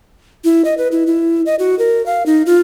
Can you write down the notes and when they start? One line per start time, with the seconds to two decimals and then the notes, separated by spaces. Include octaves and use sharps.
0.44 E4
0.65 D#5
0.78 B4
0.92 E4
1.07 E4
1.46 D#5
1.59 F#4
1.79 A#4
2.06 F5
2.26 D#4
2.46 F4